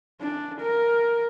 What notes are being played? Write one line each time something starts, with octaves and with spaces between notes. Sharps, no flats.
D4
A#4